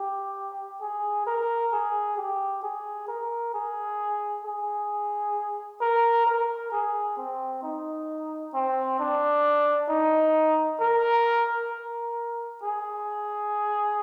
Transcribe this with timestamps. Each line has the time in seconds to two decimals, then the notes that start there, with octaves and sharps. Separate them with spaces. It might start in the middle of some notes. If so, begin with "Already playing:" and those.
Already playing: G4
0.81 G#4
1.27 A#4
1.73 G#4
2.18 G4
2.63 G#4
3.08 A#4
3.54 G#4
4.45 G#4
5.81 A#4
6.27 A#4
6.72 G#4
7.17 C4
7.63 D#4
8.54 C4
8.99 D4
9.89 D#4
10.80 A#4
11.71 A#4
12.63 G#4